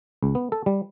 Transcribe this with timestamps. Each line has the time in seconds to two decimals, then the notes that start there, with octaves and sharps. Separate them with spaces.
0.23 C#2
0.35 B3
0.52 A4
0.66 G3